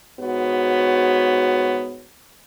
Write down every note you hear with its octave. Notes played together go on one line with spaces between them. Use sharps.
G#2 B3 F#4 C#5